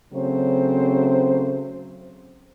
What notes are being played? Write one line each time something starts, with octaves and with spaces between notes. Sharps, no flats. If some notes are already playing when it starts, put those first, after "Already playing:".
C#3 F#3 A3 C4 C5